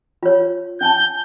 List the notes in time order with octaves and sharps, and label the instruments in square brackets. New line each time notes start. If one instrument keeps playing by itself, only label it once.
[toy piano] F4 C#5
[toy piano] C#4 G#5 A5 [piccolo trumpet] G6